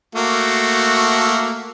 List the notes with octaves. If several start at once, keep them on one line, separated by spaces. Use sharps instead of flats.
A3 A#3 F#4